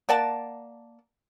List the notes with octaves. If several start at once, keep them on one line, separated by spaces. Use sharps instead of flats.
A#3 D5 F#5 A5